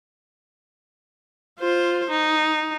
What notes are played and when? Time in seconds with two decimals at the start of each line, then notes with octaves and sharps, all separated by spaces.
1.59 F4 C5
2.10 D#4